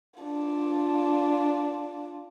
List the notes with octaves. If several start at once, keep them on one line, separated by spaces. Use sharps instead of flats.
D4 F4